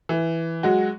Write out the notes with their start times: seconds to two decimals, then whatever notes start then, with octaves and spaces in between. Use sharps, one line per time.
0.09 E3
0.63 F#3 G#3 F#4